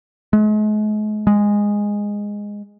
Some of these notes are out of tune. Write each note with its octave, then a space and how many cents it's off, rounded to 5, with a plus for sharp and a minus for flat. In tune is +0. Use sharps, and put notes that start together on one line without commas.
G#3 +40
G#3 -10